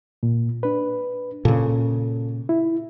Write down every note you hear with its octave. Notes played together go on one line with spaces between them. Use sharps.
A#2
D4 B4
A#2 C#3 A4
E4